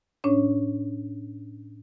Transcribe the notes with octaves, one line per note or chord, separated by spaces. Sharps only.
A2 C#4 D4 C#5